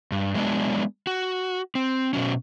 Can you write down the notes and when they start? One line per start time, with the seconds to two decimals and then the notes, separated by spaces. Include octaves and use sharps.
0.12 G2
0.35 F#3 G#3 B3 D4
1.07 F#4
1.75 C4
2.13 B2 F#3 C#4